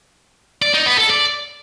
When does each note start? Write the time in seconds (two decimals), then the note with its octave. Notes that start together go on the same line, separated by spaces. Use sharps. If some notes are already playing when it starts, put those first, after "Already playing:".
0.62 D5
0.74 D#4
0.86 B3
0.98 A4
1.10 D5